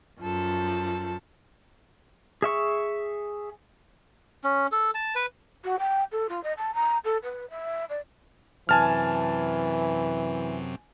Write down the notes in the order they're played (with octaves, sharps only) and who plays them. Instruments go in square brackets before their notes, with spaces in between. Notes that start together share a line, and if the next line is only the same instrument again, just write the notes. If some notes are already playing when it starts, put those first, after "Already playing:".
[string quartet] F#2 F3 A4
[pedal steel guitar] G#4 E5 C#6
[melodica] C#4
A4
A5
B4
[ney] F#4
G5
A4
F4
D#5
A5
A#5
A4
B4
E5
D5
[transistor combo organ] F#2 C3 [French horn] E3 [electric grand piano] G#5 A5 F6